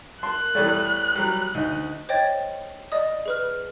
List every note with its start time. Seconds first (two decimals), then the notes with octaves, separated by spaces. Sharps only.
0.23 A#4 A5 C6 F#6
0.55 E2 G3 A3 B4 C#5 D5
1.15 F#3 G3
1.55 D2 D#4 D#5
2.09 C5 C#5 D#5 G5 G#6 A6
2.92 D5 D#5 D#6
3.26 G#4 B4 F6